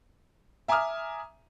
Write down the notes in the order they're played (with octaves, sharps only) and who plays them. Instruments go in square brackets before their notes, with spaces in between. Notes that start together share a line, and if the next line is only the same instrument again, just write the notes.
[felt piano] E5 G#5 A#5 D6 D#6 F6